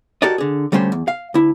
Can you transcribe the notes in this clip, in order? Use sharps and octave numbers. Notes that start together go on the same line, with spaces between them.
F#4 G4 A4 A#4 D5 D#5
D3 G#4
D2 G3 A3 C#4 C5
E2
F5
D2 E4